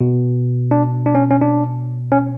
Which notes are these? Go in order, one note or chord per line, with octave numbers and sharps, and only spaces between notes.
B2
D4
D4
C#4
C#4
D4
C#4